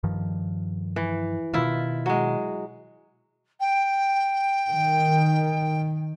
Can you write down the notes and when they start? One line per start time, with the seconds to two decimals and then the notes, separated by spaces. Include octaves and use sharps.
0.04 G2 D#3 F3
0.96 E3
1.54 B2 D#3 E4 F4
2.06 F#3 G#3
3.60 G5
4.69 D#3